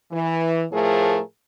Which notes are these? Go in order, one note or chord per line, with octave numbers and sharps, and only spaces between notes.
E3
A2 F3 A3 G#4 A#4